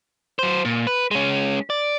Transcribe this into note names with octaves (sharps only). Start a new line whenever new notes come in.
F#3 C5
A#2
B4
G#3 C#4
D5